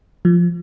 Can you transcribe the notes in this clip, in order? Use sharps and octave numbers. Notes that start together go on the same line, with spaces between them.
F3